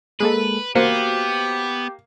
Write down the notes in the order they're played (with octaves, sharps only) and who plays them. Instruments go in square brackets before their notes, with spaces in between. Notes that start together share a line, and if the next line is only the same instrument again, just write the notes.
[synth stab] G#3 A#3 A4 [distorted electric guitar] B4
[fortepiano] A#3 [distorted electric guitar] B3 [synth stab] F#4 C5 [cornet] G4